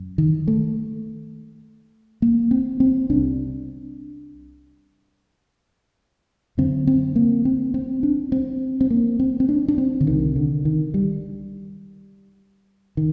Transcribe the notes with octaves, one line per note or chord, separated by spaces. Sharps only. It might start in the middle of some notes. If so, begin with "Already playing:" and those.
Already playing: F#2
D#3
A3
A#3
C4
C4
C2 C3 D4
F#2 D3 C4
C4
A#3
C4
C4
D4
C4
C4
A#3
C4
C4
D4
D4
C4
D3
C2 C3 D#3
D3
D#3
G3
D#3